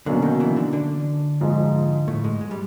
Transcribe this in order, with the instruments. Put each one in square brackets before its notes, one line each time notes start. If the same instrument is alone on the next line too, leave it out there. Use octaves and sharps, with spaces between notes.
[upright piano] B2 F#3 A#3 C#4 F#4 [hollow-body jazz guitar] D3 D4
[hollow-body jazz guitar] D#3 D#4
E3 E4
D3 D4
D3 D4
[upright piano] G#2 F3 G#3
[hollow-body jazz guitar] A2 A3
G#2 G#3
G#3
G3